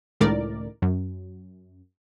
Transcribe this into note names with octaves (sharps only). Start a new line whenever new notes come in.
C#2 A2 D#3 A#4 D5
F#2